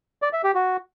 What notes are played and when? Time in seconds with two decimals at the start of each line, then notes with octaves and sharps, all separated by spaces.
0.22 D5
0.33 E5
0.44 G4
0.55 F#4